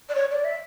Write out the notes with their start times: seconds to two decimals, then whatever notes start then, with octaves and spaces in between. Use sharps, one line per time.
0.09 D5
0.15 C#5
0.31 D5
0.44 E5